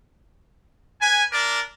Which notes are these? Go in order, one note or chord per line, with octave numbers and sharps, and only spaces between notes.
B4 G#5
D4 A#4 D5